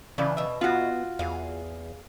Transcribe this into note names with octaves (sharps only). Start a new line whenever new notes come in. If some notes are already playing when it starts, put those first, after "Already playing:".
C#3 E3 D4 E4 F4
B2 E5
B3 F4 F#4
E2 G#4 F5